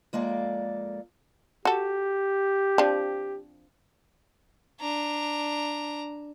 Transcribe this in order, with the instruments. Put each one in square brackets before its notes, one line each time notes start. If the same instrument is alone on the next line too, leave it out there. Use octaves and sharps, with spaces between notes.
[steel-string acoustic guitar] F2 G#3 A#3 A4 D5
[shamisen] F#4 A4 [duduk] G4
[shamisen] F3 C4 D4
[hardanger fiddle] D4 A#5